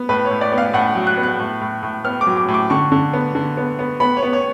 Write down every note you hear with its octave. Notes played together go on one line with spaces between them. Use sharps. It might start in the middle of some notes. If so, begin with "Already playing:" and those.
Already playing: B3
A2 B4
C#5
A2
D5
B3
F5
A2 F#5
F#3
F#6
B3
F#6
A2
A2
A2
B3 F6
D6
F#3
D6
A2
D6
D3 C#6
D3
B3
D3
B3
B3
B3 B5
C#5
B3
C#5